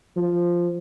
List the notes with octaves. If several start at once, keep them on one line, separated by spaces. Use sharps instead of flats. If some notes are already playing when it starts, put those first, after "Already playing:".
F3